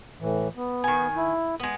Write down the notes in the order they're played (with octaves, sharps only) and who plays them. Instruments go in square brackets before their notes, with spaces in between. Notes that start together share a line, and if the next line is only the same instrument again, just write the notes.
[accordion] A2 E3
B3
[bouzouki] D#3 G#5
[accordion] E4
[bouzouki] G#3 B3